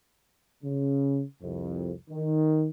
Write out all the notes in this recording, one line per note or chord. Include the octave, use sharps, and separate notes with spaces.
C#3
C2 F2
D#3